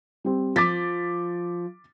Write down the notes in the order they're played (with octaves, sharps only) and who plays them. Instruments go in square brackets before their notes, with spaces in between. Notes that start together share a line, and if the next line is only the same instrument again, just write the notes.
[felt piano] G3 C4
[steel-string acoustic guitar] F3 [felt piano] D6 A6 B6